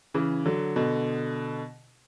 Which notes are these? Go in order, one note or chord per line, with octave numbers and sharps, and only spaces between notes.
C#3 E3
D3 F#3
B2 D3